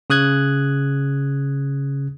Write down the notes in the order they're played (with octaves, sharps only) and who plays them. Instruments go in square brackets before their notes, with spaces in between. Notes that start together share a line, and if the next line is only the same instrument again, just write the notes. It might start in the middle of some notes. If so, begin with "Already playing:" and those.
[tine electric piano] C#3 D#6 F#6 G#6